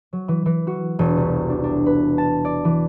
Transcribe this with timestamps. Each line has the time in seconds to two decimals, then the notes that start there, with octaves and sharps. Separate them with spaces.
0.13 F#3
0.28 E3
0.46 E3
0.67 F#4
0.99 E1
1.16 C2
1.50 D4
1.64 D4
1.86 B4
2.18 A5
2.45 D5
2.65 E3